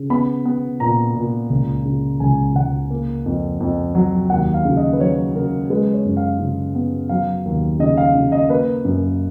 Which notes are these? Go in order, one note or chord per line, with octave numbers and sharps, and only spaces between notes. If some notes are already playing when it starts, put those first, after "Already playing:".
Already playing: C#3
B3 B5
B3
A#2 A#5
A#2
C#2
C#3
C#2 G#5
C#2 F#5
A#3
F2
F2
F#3
D#2 F#5
F5
C#3
D#5
B4
F#3 C#5
C#3 A#4
G#3 B4
C#5
F#2
F5
C#3
B3
F#3 F5
D#2
C#3 D#5
F5
C#3
D#5
A#3 B4
F#2